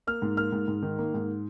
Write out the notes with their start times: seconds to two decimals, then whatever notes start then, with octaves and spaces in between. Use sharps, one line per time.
0.07 A#3 F6
0.22 G#2
0.37 A#3 F6
0.52 G#2
0.68 G#2
0.82 D#3
0.98 A#3
1.14 G#2